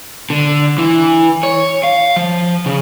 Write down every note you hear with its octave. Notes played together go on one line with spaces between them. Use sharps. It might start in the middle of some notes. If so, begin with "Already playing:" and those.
D3
E3
C#5
F5
F3
C#3